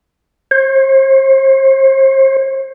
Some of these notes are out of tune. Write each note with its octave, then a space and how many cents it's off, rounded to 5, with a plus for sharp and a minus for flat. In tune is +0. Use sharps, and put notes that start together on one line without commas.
C5 +40